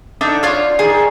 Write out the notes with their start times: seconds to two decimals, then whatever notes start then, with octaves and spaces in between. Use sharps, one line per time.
0.21 D3 D4 D#4 E5
0.43 D4 F4 C#5 F5
0.79 D#3 G#4